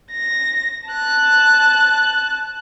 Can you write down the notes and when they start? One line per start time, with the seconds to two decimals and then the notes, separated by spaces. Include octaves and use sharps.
0.11 A#6
0.89 A5 F#6